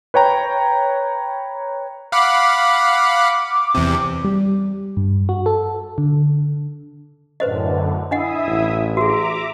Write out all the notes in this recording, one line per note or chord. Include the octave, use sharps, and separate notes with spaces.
B4 C#5 G5 A#5
F5 F#5 B5 D6
E2 C3
G3
G2
F#4
A4
D3
F#2 A2 D3 B4 C5 D#5
D4 E4 D#5 E5 F#5 D#6
A1
F#4 G#4 E5 A#5 D6